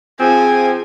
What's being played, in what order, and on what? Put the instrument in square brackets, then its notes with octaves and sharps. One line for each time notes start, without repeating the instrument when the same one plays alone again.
[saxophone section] F3 C4 [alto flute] G#4 [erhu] G#5